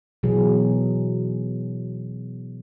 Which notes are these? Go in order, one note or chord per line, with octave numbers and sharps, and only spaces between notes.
B2 E3 F#3 G#4